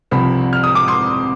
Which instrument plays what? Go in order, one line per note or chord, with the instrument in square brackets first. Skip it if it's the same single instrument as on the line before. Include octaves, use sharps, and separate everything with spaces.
[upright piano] C2 C3 F3 C4 B5
F6
D#6
D6
C6